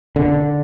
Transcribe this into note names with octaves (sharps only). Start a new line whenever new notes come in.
D3